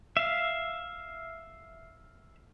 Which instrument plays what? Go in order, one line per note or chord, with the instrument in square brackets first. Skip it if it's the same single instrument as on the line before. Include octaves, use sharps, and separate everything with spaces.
[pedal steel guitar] E5 F5